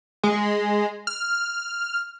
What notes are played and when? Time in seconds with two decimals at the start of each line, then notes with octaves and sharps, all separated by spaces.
0.23 G#3
1.07 F6